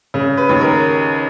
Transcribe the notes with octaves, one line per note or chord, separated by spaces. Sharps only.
C#3
B4
D#2
A#4